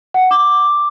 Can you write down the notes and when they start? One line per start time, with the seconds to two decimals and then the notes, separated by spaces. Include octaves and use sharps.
0.14 F#5
0.31 D6